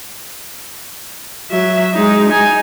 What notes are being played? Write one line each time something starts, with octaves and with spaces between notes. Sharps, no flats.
F#3 E5
G#3 D#4
D#4 G#5